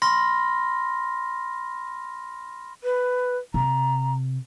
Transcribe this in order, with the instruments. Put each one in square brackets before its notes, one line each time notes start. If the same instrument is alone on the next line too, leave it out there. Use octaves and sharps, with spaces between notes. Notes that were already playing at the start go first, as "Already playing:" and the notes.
[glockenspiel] B5 C6 F6 A#6
[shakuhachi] B4
[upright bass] C3 [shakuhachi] A#5